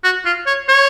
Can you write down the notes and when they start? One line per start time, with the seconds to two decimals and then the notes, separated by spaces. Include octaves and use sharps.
0.04 F#4
0.25 F4
0.46 C#5
0.69 C#5